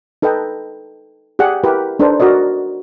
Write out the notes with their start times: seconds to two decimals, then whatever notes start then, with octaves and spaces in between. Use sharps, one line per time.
0.22 D#4 A4 B4 D#5 G5
1.39 G4 G#4 D5 F#5
1.63 E4 G4 A#4 B4
1.99 D4 D#4 A4 B4 C5
2.20 F#4 A#4 D5 D#5